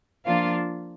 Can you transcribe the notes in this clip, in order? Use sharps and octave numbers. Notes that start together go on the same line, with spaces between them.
F3 A#3 D4 F4 F5